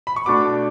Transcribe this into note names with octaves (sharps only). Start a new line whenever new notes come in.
B5
C#6
B2 A3 D4 D6